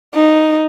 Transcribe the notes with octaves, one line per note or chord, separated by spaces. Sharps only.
D#4